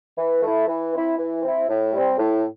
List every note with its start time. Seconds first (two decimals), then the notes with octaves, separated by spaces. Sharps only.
0.16 E3
0.42 A3 E4
0.67 E3
0.93 C4 E4
1.17 E3
1.43 C4 E4
1.68 A2
1.93 G3 C4
2.18 A2